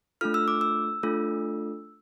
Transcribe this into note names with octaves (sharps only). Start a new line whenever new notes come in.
A3 D4 F4 A4 F6
E6
D6
E6
A3 D4 F4 A4